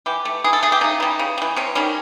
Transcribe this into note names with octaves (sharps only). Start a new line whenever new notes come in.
E3 G4
A3
E3 G#4
A4
A3 G#4
G4
C#3 D#4
E3 G3
C#3
G3
E3
C3 C#4
D#3 G3 C#4